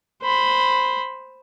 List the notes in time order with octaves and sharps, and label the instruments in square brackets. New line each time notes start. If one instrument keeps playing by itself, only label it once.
[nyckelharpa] C5 B5